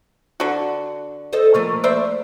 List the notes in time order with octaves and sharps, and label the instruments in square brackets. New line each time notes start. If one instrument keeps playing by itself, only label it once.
[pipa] D3 F#4
[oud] A4 C5 D#5
F3 A3 A#3
[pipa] C5 D5 E5